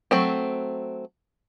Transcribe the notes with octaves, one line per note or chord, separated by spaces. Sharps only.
F#3 A3 C4